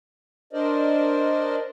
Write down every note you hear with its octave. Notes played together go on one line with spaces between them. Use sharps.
D4 A#4 C5 D5 D#5